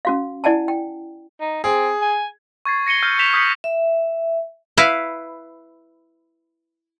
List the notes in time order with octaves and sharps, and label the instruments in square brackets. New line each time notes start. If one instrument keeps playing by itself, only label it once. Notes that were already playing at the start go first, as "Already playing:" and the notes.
[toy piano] C#4 F#4 F5
E4 D5 F#5 G#5 A5
G5
[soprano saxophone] D#4
[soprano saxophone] C4 [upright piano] G#4
[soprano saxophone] G#5
[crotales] C#6 G#6 A6 C7
A#6 C#7 D#7 G7
E6 F6 G6 D#7
G6 B6 E7 F7 G7
D#6 E6 G6 B6 C#7
[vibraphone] E5
[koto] E4 B4 F5